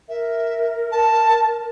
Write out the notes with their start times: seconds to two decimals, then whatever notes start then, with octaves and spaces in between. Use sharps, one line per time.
0.09 A#4 E5
0.92 A5